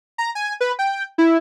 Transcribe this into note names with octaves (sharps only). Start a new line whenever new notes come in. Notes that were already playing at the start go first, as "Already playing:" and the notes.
A#5
G#5
B4
G5
E4